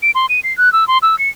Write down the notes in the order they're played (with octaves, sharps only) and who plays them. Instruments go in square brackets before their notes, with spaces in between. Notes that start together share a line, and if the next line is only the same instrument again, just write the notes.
[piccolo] D7
C6
D#7
C7
F#6
E6
C6
E6
C#7